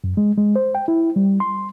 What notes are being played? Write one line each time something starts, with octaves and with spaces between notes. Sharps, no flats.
F#2
G#3
G#3
C5
G5
E4
G3
C6